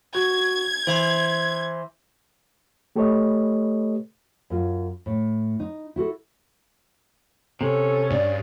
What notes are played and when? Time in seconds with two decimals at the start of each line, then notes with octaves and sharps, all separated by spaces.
0.15 F#4 G#6
0.87 E3 C5 E5 C6
2.96 A3 G4 A4 B4 C#5 D#5
4.50 F#2 F4
5.06 A2
5.60 D#4
5.96 E4 F#4 A4
7.61 C3 C#4 A4
8.10 G2 D5